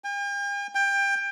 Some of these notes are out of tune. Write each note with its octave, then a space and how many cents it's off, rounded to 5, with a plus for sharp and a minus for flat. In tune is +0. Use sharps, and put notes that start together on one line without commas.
G5 +45
G5 +20